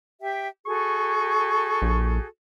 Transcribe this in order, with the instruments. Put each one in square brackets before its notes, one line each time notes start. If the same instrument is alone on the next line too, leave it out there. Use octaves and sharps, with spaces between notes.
[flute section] G4 E5 G5
[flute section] F#4 G#4 A4 [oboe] C#6
[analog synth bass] A#1